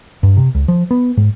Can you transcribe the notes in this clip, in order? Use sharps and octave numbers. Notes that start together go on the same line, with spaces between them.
G2
C3
C#2
F3
B3
G#2